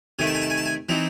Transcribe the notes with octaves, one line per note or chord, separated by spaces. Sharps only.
C3 D#3 A3 G#5
A5
G#5
A5
G#5
A5
G#5
E3 C4 D#4